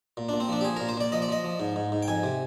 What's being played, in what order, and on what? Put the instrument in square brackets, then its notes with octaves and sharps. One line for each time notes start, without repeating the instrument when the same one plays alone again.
[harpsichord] A#2
A#2 D4
C4
F3 D4
G4
F3 G#4
A#2 A#4
C5
A#2 D5
F3 D#5
D5
F3 D#5
F3
G#2
G#2
G#2
G5
F2 G#5
C3